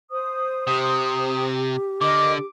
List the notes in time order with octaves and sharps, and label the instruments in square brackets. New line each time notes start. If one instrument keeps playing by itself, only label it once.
[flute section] C5 D#6
[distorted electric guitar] C3 [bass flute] G4
[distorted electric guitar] D3 [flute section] A#4 D#5 [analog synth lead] D6